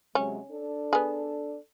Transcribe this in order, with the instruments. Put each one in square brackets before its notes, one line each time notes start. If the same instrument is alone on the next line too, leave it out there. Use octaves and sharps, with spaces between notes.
[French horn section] C3 F#3 G#3 [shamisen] C#4
[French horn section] D4 A4
[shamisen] B3 G#4